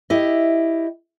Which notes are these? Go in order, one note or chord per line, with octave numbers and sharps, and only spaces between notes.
E4 G4 D#5